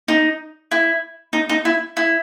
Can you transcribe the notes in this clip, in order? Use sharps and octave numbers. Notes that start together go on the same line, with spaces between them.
D#4
E4
D#4
D#4
E4
E4